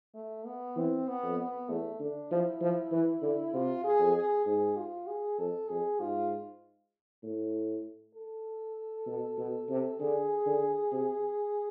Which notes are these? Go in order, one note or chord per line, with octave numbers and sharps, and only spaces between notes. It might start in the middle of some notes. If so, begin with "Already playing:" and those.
A3
B3
E3 C4
B3
F2
B3
E2 A3
D3 D4
F3 E4
F3
E3
D3
C3 F4
G#4
F2
G#4
G#2 G#4
F4
G#4
F2 A4
F2 G#4
G#2 F4
A2
A4
B2
B2
C3
D3 G#4
D3
C3